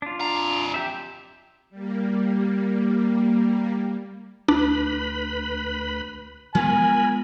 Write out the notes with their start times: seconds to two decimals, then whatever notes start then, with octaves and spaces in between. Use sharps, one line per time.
0.02 D4 F4
0.21 F2 A#5
0.74 G4 E5
1.70 G3 A#3
4.48 D2 D4 B4 B5
6.55 F3 G#3 B3 A#4 G#5 B5